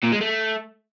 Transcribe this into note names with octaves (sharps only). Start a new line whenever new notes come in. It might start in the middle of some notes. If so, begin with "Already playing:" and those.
A#2
G#3
A3